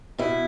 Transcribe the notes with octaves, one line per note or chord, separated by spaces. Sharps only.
B2 E4